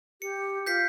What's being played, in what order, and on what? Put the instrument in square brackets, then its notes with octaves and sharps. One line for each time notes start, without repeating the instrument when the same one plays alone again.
[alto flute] G4 [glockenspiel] C#7
[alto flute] F4 [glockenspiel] G6 B6 C7